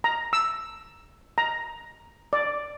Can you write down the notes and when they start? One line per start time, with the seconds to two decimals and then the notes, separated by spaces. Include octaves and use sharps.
0.04 A#5
0.33 E6
1.38 A#5
2.33 D5